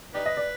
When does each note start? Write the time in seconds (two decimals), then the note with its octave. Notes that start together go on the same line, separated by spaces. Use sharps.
0.14 D#4 G4 B4 D5
0.26 D#5
0.37 D5